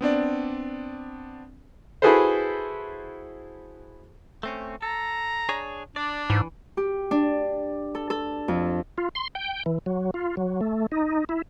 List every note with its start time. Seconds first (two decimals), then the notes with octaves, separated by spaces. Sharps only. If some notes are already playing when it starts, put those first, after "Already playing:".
0.01 B3 C4 D4 D5
2.02 E4 F#4 G#4 A4 B4 C5
4.43 A3 C4 C#4
4.82 A4 A#5
5.49 D4 G#4 C#5
5.96 D4 D5
6.30 G#2 E3
6.77 G4
7.11 D4
7.95 A4
8.10 A4
8.48 F2
8.98 F4
9.15 C6
9.35 G5
9.66 E3
9.86 F#3
10.14 F4
10.37 F#3
10.61 A3
10.92 D#4
11.29 E4